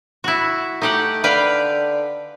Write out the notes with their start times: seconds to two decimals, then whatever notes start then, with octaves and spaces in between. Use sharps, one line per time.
0.24 E4 F#4
0.82 A3 D#4 G4 F#5
1.24 D3 B4 F5 G5